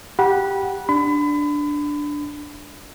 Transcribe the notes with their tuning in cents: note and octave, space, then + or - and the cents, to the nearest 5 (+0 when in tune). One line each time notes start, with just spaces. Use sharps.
G4 +0 F#5 +0 B5 -25
D4 +0 B5 +35